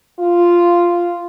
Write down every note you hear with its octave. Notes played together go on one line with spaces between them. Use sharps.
F4